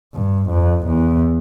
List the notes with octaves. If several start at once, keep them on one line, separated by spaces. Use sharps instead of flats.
G2
F2
E2